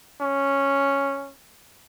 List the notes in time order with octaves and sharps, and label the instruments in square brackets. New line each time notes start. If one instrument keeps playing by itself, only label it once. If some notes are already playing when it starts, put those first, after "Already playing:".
[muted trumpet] C#4